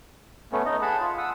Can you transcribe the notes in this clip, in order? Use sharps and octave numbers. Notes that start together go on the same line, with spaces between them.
A3 B3 C#4
D#4 D#5
G#4 F#5 A5 B5
F4
F#5 D#6 E6